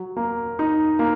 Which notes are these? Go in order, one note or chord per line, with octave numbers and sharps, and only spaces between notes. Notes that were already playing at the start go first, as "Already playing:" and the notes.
Already playing: F#3
A#3
D#4
A#3